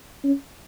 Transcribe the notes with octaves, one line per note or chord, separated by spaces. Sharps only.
C#4